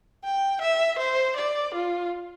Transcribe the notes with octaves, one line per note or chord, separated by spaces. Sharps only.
G5
E5
C5
D5
F4